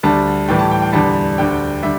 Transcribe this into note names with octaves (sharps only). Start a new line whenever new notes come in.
D2 D3 G3 A5
A2 E3 G3 G5
A5
G5
G5
E2 D3 G3 A5
D2 D3 G3 G5
D3 G3 E5